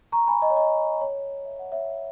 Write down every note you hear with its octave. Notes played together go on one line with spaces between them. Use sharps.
A#5 C#6
G#5 B5
D#5
C#5
D#5
C#5
E5
F#5
C#5 E5